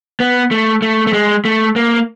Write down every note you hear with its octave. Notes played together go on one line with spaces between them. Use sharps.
B3
A3
A3
A3
G#3
A3
A#3